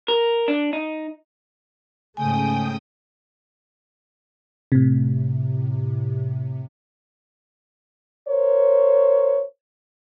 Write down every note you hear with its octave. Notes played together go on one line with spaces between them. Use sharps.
A#4
D4
D#4
G#2 C#3 A3 G5 G#5 D#6
A2 C3
A#4 C5 C#5